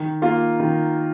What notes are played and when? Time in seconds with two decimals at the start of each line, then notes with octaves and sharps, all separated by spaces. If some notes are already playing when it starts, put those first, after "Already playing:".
Already playing: D#3
0.22 A#3 F4
0.60 D#3